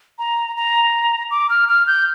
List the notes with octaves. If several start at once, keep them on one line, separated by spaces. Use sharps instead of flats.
A#5
A#5
D6
F6
F6
G6